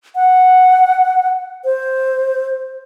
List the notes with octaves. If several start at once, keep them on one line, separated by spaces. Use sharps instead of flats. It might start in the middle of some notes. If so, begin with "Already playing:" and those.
F#5
C5